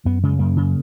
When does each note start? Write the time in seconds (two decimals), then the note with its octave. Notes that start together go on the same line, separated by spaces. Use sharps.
0.05 F#2 B3
0.23 C#3 G#3
0.39 F#2 A#3
0.56 C#3